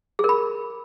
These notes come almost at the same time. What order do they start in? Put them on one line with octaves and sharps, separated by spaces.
G#4 A#4 B5